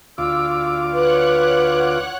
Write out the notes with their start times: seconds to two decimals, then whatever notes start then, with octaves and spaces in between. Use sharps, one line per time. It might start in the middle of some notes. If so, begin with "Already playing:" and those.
0.18 D2 F4 D6 E6
0.92 B4 C#5 F#5 F#6